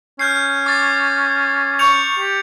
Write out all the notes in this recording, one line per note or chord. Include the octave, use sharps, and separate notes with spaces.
C#4 F6 G6 C7
D6 A6
C#6 G6 C#7 F7
G4